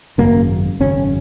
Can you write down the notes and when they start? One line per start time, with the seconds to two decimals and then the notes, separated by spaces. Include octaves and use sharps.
0.18 G#1 F#2 C#3 A#3
0.80 G#1 F#2 C#3 C#4